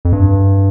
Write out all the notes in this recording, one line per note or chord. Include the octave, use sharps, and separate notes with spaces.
F2
G2